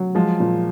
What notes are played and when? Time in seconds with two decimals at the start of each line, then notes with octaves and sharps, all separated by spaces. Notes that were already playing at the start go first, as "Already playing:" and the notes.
Already playing: F#3
0.15 F3 G#3
0.40 A#2